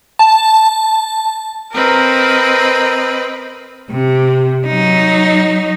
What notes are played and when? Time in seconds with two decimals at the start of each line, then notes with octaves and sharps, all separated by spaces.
0.19 A5
1.74 C4 A#4 B4 D#5
3.91 C3
4.67 F#3 D#4